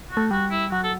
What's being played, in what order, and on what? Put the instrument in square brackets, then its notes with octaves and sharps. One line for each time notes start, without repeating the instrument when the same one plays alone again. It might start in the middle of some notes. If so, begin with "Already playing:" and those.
[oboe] F#4
[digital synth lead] A3
[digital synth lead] G3 [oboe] F#4
[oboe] E4
[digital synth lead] F#3 [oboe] F#4
[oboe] A4